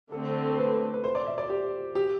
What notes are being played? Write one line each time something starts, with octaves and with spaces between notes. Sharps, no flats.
D3 A3 C4 A4
C5
B4
B4
C5
D5
E5
D5
G4
G4